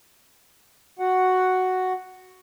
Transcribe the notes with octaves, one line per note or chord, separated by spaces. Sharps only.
F#4 F#5